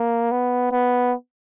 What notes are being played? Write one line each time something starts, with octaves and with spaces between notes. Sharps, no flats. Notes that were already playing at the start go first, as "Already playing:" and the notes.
Already playing: A#3
B3
B3